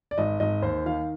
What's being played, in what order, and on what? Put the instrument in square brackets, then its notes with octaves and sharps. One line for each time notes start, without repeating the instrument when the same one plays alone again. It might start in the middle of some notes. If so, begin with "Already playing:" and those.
[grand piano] D5
G#1 D#5
G#1 D#5
D#2 C5
D#3 F5